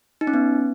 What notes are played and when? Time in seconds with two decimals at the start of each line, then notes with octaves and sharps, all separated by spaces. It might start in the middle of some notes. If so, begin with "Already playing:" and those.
0.21 D#4
0.27 C#4
0.34 B3